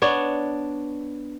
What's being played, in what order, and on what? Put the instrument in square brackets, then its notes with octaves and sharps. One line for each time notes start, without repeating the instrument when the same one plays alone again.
[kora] B3 D4 C#5